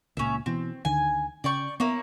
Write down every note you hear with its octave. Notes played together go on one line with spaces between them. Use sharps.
C#2 A#2 C#4 E5
B2 E3 C4
D2 D3 D#3 G#5
C#3 D5 G5 C#6
A#3 B3 E4 C#5